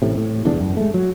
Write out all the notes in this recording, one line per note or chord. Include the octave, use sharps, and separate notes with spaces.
A1 A2 C3
A2
F1 E2 D3 D4
F#2
G#3 A3
F#3